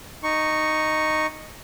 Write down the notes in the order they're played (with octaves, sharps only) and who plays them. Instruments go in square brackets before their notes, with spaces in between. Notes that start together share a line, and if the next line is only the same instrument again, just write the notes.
[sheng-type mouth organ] D#4 C#6